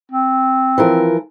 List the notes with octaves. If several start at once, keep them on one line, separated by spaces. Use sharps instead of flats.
C4
E3 F3 A#4